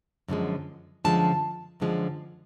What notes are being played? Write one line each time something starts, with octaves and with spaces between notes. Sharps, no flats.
F#2 D3 F3 G#3
F#2 D3 F3 G#3 A5
F#2 D3 F3 G#3